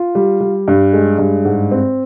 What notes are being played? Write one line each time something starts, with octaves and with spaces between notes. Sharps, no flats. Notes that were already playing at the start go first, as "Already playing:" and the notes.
Already playing: F4
G3
G3
G2
G#3
G2
G#2
C4